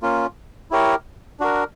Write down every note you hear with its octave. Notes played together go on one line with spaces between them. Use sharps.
A#3 C#4 F4
E4 G4 A#4 C#5
D4 F#4 A#4